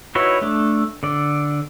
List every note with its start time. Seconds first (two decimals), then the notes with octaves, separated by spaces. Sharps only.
0.15 D#4 E4 F#4 B4 C#5
0.41 A3 D4
1.03 D3 D5